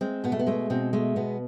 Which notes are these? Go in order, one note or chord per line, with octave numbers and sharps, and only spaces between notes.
G#3 C4
B2 B3
A3
B3
G#3 A3
B2 C4
G#3 A3
B2 B3